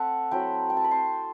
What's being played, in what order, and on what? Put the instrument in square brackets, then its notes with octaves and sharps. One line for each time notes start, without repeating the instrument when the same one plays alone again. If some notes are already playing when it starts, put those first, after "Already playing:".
Already playing: [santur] A3 C4 E5 F#5 A5
F#3 A3 C4 E4 G5 B5
G5
A5
B5
A5 C6